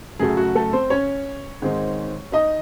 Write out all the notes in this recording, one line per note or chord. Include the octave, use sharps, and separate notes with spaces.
F#2 C#3 F#3 A3 G#4
F#4
A3 A4
C4 C5
C#4 C#5
G#2 D#3 G#3 C4
D#4 D#5